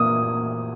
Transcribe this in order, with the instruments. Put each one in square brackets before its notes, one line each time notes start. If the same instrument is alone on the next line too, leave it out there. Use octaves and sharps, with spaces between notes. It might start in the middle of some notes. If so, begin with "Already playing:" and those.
Already playing: [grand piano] A#2 A#3 D#6